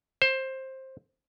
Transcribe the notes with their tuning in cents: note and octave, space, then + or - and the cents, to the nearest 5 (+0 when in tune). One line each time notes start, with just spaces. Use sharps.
C5 +15